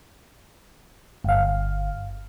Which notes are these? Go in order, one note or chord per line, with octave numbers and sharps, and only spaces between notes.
G1 F5